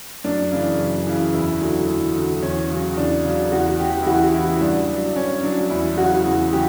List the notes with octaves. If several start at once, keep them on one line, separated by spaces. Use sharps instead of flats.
F#2 D4
C#3 E3
F#2
C#3 E3
E2 E4
D3 F#3
E2
D3 F#3
E2 C#4
C#3 F#3
E2 D4
C#3 F#3
E2 F#4
C#3 E3 G4
E4
E2 F#4
C#3 E3 E4
G2 D4
F#3
G2 C#4
F#3 D4
E2 E4
C#3 F#3 F#4
E2
C#3 F#3 G4